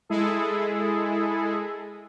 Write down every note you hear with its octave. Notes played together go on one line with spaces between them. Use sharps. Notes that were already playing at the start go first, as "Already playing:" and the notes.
G#3 E4 G#4 A4